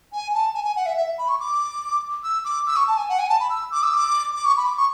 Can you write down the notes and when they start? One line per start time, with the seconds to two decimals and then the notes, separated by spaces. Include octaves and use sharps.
0.13 G#5
0.34 A5
0.54 G#5
0.65 G#5
0.76 F#5
0.86 E5
0.97 E5
1.19 B5
1.28 C#6
1.40 D6
2.24 E6
2.45 D6
2.67 E6
2.76 C#6
2.88 A5
2.97 G#5
3.09 F#5
3.19 G#5
3.29 A5
3.40 B5
3.50 E6
3.72 D6
3.83 E6
3.93 D6
4.35 D6
4.45 C#6
4.57 B5
4.67 D6
4.78 C#6